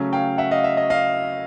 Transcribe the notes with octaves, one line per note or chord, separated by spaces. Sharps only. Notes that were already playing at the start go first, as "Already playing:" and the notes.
Already playing: C#3 F#3 A3 C#4
F5 G5
E5 F#5
D#5 F5
E5
D#5
D#5 F5